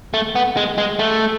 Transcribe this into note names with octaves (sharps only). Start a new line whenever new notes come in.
A3
B3
G#3
G#3
A3